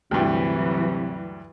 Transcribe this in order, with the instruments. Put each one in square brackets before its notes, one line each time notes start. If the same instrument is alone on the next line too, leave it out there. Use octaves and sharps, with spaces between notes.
[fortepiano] D2 G2 [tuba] C3 [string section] E3 F#3